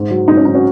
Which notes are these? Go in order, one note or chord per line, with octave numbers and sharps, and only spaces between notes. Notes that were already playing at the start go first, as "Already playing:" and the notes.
Already playing: G#2
F#3
G#2 D#4
C#4
F#3 D#4
C#4 F#4